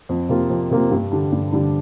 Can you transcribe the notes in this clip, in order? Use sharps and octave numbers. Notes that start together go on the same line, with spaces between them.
F2
C3 A#3 F4
F2
C3 A#3 F4
G2
D3 G3 D4
G2
D3 G3 D4